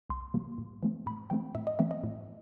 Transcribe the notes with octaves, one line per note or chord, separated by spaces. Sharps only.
C2 C6
C3 E3 G3 A#3
A2
E3 A3 C4
A2 B5
E3 A3 C4 G5
A2 E5
D#5
E3 A3 C4 E5
D#5
A2